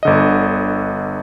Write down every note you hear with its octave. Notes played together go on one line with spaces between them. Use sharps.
G1 D3 D#5